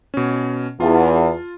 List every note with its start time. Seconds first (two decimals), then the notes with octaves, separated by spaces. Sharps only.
0.14 B2 C#4
0.80 E2 F4 A5